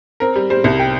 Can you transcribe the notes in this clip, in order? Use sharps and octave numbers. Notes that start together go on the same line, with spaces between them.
C4 A#4
G3
G3 C5
C2
G5